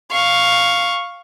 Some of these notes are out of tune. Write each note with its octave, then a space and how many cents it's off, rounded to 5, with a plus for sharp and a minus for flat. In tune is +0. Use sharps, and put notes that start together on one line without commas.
F5 +0 C#6 +0